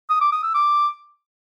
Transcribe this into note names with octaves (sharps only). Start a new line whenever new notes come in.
D#6
D6
D#6
E6
D6